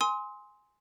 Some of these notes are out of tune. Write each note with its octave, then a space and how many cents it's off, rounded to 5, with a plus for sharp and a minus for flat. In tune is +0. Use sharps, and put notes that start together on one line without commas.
G#5 +0 C6 +0 D#6 +40